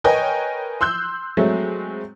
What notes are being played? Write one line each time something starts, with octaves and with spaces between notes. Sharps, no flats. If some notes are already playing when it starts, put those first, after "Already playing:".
A#4 B4 C#5 D#5 G5 G#5
C6 E6 F#6 G6
F#3 G#3 A3 C4